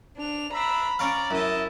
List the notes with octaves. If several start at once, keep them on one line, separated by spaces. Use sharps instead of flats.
D4 F7
D4 E5 A#5 B5
C#4 C#5 D5 F5 A#5
F#2 E4 D#5 E5 A5